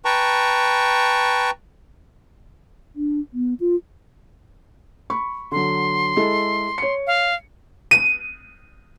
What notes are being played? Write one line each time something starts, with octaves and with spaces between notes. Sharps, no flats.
B4 G5 A5 A#5 C#6
D4
B3
F4
B5 C#6
D3 F#3 C6
G#3 E4 A4
C#5 C#7
F5
D#7